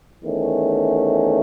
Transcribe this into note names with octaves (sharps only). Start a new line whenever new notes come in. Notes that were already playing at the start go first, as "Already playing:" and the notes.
E2 D#3 A3 C#4